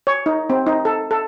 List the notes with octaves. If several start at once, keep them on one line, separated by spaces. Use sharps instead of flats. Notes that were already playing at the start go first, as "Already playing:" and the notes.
C#5
D#4
C4
D#4
A4
A4